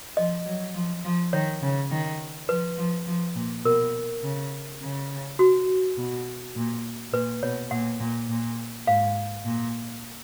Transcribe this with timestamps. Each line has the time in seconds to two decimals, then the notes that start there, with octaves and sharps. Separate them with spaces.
0.17 F3 D#5
0.45 F#3
0.75 F3
1.04 F3
1.33 D#3 C#5
1.62 C#3
1.91 D#3
2.49 F3 B4
2.78 F3
3.07 F3
3.36 A#2
3.65 B2 A#4
4.23 C#3
4.81 C#3
5.39 F#4
5.97 B2
6.55 A#2
7.13 A#2 B4
7.42 B2 C#5
7.71 A#2 F#5
8.00 A#2
8.29 A#2
8.87 G#2 F5
9.45 A#2